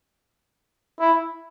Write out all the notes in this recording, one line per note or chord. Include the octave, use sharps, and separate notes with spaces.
E4